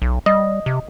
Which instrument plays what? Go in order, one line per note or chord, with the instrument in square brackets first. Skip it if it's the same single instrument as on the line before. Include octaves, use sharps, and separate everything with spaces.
[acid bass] B1
[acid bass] G3 [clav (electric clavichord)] D#5
[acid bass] C3